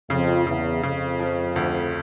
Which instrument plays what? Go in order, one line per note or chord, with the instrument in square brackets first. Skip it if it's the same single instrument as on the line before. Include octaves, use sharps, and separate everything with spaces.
[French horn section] F2 [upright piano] C#3
[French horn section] E2 [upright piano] C#3
[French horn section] F2 [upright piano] C#3
[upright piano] F3
D2